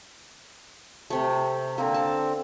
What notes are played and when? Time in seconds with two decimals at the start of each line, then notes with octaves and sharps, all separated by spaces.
1.10 C3 A3
1.78 D3 A#3 C4
1.94 A5